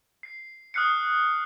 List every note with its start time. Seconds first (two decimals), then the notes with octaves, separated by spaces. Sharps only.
0.23 C7
0.74 D#6 F6 F#6 C7 C#7